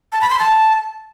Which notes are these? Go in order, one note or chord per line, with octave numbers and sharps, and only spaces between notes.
A5
B5
C6
A5